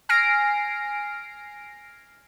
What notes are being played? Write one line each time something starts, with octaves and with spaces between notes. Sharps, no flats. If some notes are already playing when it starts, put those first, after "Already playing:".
G#5 F6 A#6 C7 D7